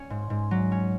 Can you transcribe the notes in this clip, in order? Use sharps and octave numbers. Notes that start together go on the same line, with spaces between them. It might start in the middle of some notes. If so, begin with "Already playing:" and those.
Already playing: C#4
G#2
G#2
F#3
C#4